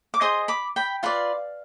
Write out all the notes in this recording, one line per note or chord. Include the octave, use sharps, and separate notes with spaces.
D6
G#4 C5 D#5 C6 D#6
B5 D6
G5 B5
F4 B4 D5 F5